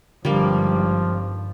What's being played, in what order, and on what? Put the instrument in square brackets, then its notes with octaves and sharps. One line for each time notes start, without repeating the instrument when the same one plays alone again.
[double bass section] G#1 G2 [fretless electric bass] D3 [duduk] F3 [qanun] G3 A#3